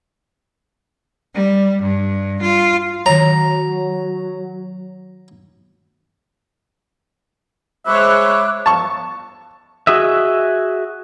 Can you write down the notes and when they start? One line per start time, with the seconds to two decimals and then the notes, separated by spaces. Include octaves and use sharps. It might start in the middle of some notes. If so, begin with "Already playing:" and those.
1.34 G3
1.81 G2
2.40 F4
3.06 D#3 F#3 C#5 A#5
7.86 G#3 C5 C#5 E5 B5 D6 F#6
8.66 A5 C#6
9.87 F#4 G#4 D#5 E5